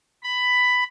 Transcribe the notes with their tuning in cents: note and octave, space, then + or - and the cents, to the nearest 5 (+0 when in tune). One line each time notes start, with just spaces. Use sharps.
B5 +10